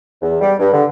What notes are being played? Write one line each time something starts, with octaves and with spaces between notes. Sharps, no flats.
E2
G3
G2
D3